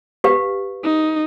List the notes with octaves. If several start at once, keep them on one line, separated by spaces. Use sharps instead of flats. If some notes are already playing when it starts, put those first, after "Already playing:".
G4 B4 F5
D#4